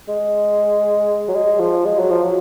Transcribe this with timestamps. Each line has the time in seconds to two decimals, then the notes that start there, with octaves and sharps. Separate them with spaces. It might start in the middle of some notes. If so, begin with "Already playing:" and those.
0.08 G#3
1.28 F#3
1.35 G#3
1.59 F3
1.85 G#3
1.98 F#3
2.10 F3
2.23 F#3